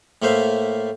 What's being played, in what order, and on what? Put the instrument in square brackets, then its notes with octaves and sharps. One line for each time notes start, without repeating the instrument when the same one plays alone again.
[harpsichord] A2 A3 A#3 C5 E5 F5